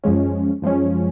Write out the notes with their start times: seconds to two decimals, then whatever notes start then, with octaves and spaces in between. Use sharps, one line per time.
0.04 F#2 F3 G#3 C#4
0.62 F#2 F3 G#3 C#4